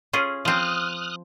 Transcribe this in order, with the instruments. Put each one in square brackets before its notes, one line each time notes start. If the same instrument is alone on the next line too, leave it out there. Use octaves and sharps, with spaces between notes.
[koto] C#4 F4 G#4
[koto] F3 C4 [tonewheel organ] D#6 F6 F#6